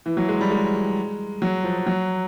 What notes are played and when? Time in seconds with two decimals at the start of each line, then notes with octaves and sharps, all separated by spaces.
0.06 E3
0.17 F#3
0.29 G#3
0.41 G3
0.51 G#3
1.42 F#3
1.64 F3
1.87 F#3